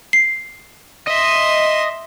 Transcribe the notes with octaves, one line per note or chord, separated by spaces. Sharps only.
C7
D#5 E5 C6